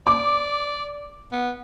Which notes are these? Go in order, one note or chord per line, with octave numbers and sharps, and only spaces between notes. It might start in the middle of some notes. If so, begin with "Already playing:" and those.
D5 D6
B3